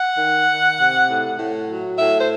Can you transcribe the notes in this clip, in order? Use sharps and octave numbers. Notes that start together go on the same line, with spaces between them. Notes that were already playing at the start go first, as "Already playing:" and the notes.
Already playing: F#5
D#3
D#3
C3
A2
A2
F#3
A2 E5
C5